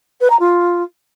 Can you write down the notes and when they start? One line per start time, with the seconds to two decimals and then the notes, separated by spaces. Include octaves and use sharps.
0.20 B4
0.29 A#5
0.39 F4